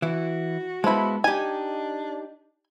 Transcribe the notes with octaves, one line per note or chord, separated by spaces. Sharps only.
E3 E4 F#4
F3 G#3 B3 E4
D4 D#4 G4 G#5